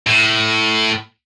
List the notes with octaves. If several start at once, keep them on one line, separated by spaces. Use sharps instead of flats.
A2